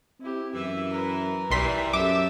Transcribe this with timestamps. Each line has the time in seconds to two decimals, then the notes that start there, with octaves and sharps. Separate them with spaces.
0.21 C4 E4 G4
0.54 F#2 E3 E5
0.91 A#4 B4
1.50 B1 E3 G3 C6 B6
1.93 F#2 G4 A4 E5 D6